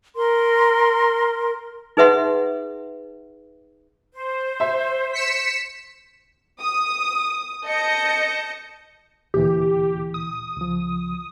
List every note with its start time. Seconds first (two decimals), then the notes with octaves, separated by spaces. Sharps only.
0.16 A#4 C6
1.97 D#4 G#4 B4 E5 F#5 C6
4.14 C5
4.60 E5 C6
5.13 B6 C#7 E7
6.61 D#6
7.66 D#5 A5 G6 A#6 C#7
9.34 D2 A#2 E3 G4
10.14 D#6
10.57 C#2 F3